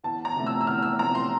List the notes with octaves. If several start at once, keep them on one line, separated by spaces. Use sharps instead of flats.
E2 A5
A#5
C3 F3 A3
E6
E6
E2 F6
E6
C3 F3 A3 A#5
C6